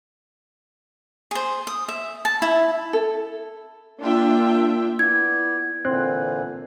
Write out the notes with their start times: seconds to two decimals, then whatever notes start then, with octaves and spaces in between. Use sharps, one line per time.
1.31 G#4 C5
1.67 D#6
1.88 E5
2.25 A5
2.42 E4 E5
2.93 A4
4.01 A#3 D4 F4 E5 G5
4.99 B3 E4 D5 G#6
5.85 A#2 D3 E3 C4 F#6